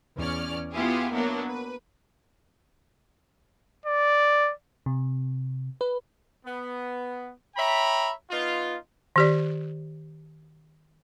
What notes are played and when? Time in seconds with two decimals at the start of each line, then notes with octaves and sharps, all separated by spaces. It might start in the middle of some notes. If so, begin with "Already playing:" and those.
0.17 E2 C#4 D5 F6
0.73 B3 E4 F4 G4 G#4
1.12 F#3 A#3 B3 D4 E4
1.47 B4
3.86 D5
4.86 C3
5.81 B4
6.45 B3
7.56 C#5 E5 G5 A#5 B5
8.30 B3 D#4 F4
9.16 D#3 G4 D5